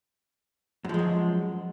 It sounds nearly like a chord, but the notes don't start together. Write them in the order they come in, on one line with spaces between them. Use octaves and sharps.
F#2 F3 G#3 F#3